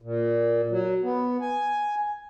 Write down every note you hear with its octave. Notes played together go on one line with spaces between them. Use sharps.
A#2
F#3
B3
G#5